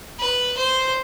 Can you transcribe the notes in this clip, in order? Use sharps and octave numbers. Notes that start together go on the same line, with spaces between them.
B4
C5